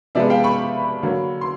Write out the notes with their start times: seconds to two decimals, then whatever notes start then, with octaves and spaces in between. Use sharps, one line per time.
0.15 C3 F3 G#3 B3 D5 E5
0.30 F5 G5
0.44 B5 C#6
1.03 D3 F#3 A#3
1.41 C6